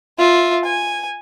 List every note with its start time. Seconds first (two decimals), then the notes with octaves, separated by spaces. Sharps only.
0.19 F4 E5
0.65 G#5